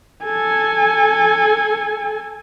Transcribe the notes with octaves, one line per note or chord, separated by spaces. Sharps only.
A4 G#5